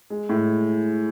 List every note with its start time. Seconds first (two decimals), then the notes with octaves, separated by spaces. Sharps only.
0.10 G#3
0.29 A2